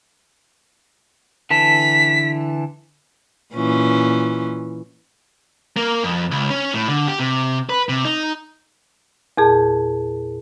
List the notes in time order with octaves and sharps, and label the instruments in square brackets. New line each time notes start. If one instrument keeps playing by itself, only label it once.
[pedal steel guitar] D3 E3 A5 [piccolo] B6
[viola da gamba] A#2 E3 C#4
[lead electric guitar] A#3
F2
C#2
C#4
A2
D3
G4
C3
B4
C3
D#4
[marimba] E2 A#2 G#4 A5